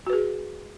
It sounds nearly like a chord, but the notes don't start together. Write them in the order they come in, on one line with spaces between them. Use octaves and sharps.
F#4 B4 G#4